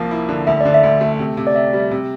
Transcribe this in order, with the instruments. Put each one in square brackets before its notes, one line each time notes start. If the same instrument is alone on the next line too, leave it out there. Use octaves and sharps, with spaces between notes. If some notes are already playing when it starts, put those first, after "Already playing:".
Already playing: [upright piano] C2 F3 A#3
E4
D3
[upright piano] D2 [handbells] E5
[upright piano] D3 [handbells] D5
[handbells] E5
[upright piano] D2
A3
C3
C3
[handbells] D5
[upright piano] C3 [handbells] E5
[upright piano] G3
C3